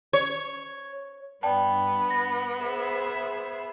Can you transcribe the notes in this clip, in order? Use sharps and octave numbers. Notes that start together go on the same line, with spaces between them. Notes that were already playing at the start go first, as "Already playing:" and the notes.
C#5
G2 B3 D5 G5 A5
A#6
G#4 C5 E5